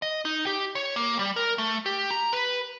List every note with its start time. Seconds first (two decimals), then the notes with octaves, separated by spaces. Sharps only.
0.02 D#5
0.25 D#4
0.47 G4
0.75 C#5
0.96 A#3
1.19 G3
1.36 A#4
1.58 A3
1.86 G4
2.11 A#5
2.33 B4